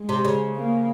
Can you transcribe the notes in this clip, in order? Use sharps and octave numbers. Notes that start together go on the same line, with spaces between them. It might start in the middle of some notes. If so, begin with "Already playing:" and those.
Already playing: G#3
C3
C#3
A#3